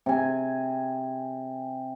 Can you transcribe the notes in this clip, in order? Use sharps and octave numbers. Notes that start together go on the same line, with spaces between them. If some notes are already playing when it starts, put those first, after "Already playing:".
C3 G#5